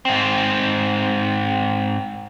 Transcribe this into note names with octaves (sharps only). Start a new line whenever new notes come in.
G#2 C4